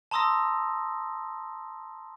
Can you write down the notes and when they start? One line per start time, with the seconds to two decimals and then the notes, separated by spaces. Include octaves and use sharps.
0.11 A5 A#5 C6 D#6 E6 A#6